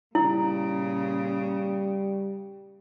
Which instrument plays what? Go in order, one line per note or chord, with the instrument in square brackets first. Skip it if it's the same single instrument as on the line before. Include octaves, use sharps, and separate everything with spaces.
[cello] A#2 C#3 [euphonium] G3 [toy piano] E4